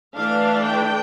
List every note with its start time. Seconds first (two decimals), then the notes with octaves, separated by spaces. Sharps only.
0.16 E3 A3 D4 F5
0.67 G5